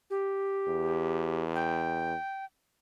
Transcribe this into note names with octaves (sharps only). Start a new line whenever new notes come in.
G4
E2
G5